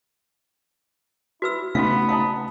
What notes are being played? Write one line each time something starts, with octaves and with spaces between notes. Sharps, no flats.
E4 F#4 B4 E6
C#3 A3 B3 C#4 D#4 F#4 E5 F5
F5 A5 A#5 D#6